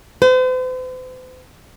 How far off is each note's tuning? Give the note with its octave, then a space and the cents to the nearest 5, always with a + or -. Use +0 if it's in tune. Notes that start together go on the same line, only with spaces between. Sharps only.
C5 -45